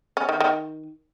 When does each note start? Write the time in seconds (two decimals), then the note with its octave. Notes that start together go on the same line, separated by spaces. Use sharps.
0.17 C#4
0.29 D#3
0.40 D#3